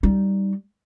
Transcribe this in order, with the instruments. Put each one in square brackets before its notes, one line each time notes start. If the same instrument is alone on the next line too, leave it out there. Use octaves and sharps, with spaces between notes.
[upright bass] G3 D#4